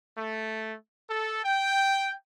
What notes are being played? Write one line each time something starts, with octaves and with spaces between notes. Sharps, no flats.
A3
A4
G5